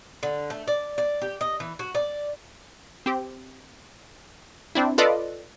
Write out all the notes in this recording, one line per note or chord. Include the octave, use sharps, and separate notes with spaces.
D3
A3
D5
D5
G4
D#5
E3
F#4
D5
C4 G4
C4 D4 E4
F4 A4 B4 D5 D#5